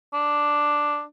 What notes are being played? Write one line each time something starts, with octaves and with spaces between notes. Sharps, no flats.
D4